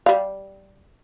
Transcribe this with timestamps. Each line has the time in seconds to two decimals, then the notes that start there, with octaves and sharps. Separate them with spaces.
0.06 G3 F5